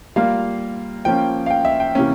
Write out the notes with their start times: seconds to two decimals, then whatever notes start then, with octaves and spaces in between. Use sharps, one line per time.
0.16 G3 A#3 F4 F5
1.05 F3 A#3 C#4 G5
1.46 F5
1.50 G5
1.65 E5
1.80 G5
1.95 C3 E3 A#3 C#4